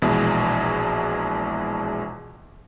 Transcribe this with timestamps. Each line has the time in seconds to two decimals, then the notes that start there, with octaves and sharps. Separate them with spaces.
0.02 A#1 E2 B2 E3 G#3